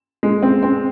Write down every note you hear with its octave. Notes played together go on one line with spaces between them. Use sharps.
G#3
C4
C4